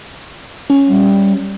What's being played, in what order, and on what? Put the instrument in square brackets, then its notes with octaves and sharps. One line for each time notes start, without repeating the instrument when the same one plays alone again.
[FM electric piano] C#4
[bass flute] G3